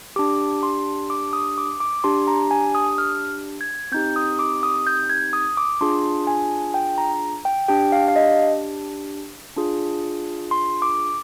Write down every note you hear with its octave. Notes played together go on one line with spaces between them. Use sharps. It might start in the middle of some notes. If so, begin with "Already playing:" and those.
D4 G4 D6
C6
D6
D#6
D6
D6
D4 G4 C6
A#5
G#5
D#6
F6
G#6
C4 D#4 G4 G6
D#6
D6
D#6
G6
G#6
D#6
D6
D4 F4 G#4 C6
G#5
G5
A#5
G5
D4 G4 G5
F5
F5
D#5
D4 F4 G#4
C6
D6